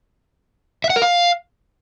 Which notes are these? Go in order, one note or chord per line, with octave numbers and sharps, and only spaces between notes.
E5
F#5
A#4
F5